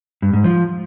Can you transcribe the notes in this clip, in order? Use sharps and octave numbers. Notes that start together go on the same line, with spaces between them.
G2
G#2
F3